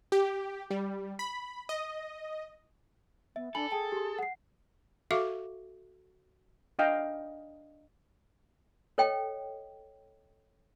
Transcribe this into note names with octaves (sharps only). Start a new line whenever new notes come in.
G4
G3
B5
D#5
B3 E5
D4 A4 G#5 B5 F#7
G#4 G5 A5
G4 C6
F#5 C7
F#4 A4 E5 F5 C#6 D6
D4 D#5 F5 G5
A4 C#5 D#5 G5